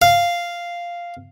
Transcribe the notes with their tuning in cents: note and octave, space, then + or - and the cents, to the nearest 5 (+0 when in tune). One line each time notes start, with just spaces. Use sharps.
F5 -5